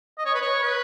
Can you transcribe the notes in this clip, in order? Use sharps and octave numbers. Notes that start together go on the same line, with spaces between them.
D#5
C#5
B4
C#5
B4